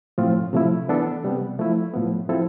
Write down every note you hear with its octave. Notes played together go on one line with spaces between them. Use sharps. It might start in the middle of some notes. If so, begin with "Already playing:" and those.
A2 F3 C4 F4
C3 F3 A3 E4
E3 B3 D4 A4
C3 G3 B3
F3 A3 E4
A2 F3 B3
F3 C4 E4 A4